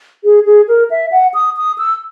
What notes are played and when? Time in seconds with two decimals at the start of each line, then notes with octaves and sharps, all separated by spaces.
0.24 G#4
0.46 G#4
0.68 A#4
0.91 E5
1.12 F#5
1.34 D#6
1.57 D#6
1.78 E6